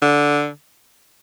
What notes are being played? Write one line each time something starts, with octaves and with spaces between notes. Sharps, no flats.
D3